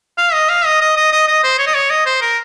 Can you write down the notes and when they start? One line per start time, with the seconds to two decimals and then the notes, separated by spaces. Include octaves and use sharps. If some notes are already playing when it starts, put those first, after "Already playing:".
0.18 F5
0.33 D#5
0.49 F5
0.65 D#5
0.81 D#5
0.97 D#5
1.12 D#5
1.27 D#5
1.43 C5
1.59 C#5
1.67 D#5
1.74 C#5
1.90 D#5
2.06 C5
2.21 A#4